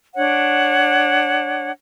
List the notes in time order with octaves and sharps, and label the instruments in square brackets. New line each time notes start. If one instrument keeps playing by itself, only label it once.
[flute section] D4 C#5 F#5